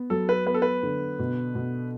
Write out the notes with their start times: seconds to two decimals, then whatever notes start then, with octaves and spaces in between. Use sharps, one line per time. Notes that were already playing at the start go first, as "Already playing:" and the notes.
Already playing: B3
0.10 F#3 A4
0.29 B4
0.46 B3 B4
0.54 A4
0.62 B4
0.83 D3
1.19 B2
1.55 B2